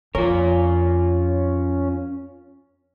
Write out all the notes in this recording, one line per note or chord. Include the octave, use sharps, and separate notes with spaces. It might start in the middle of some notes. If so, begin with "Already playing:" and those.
F2 C#4 F4 A#4